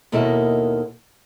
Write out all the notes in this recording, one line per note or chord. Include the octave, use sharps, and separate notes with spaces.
D#2 B2 D#3 A#3 E4 A4